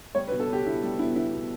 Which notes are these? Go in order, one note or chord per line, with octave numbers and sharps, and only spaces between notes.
G3 C#5
B4
B2
A4
B3 G4
B2 E4
G3
B2 E4
B3 E4
B2